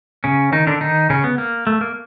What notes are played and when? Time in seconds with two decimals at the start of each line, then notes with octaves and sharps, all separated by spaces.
0.24 C#3 C#4
0.52 D#3 D#4
0.67 D3 D4
0.81 D#3 D#4
1.10 C#3 C#4
1.24 B3
1.38 A#3
1.67 A3
1.81 A#3